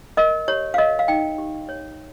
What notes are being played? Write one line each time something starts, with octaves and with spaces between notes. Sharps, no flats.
A#4 D#5
G4 C#5
F5
A#4 D#5
F5
D#4 G5
G4
C#5